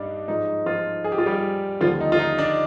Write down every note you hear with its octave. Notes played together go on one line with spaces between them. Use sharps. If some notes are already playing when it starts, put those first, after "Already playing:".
Already playing: G2 G3 D4 D#4
G#2 F3 G#3 D#4
F3 F4
G#4
G4
F4
G3 G4
D#2 D3 F3 G3 F4
D#4
F4
D#4
D4 D5